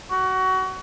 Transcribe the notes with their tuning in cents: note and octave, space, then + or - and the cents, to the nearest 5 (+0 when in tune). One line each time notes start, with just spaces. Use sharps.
F#4 +25